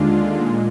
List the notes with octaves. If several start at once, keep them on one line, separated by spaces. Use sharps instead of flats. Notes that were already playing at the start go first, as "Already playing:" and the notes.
Already playing: D#2 D3 G#3 D4 F4
A#2 G#3